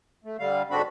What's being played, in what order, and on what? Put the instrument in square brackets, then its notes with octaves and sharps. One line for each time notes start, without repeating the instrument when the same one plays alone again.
[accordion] A3
D3 G3 F5
G#2 D3 C4 D4 F#4 B5